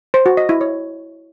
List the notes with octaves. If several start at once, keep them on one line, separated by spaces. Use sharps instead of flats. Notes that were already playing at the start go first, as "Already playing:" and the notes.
C5
F#4
D#5
E4
C#5